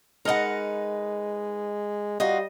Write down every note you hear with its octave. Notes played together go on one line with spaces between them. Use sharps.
G#3 D#4 A#4 B4 D#5 F#5
G3 F4 F#4 D#5